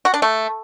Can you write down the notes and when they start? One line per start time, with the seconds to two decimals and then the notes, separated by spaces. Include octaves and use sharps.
0.05 F#4
0.14 D4
0.22 A3